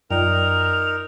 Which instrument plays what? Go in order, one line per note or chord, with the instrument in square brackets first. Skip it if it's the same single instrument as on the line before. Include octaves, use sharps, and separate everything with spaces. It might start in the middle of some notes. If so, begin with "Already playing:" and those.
[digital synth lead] F#2 [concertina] D#4 A#4 [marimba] F4 D5 G5 [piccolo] F7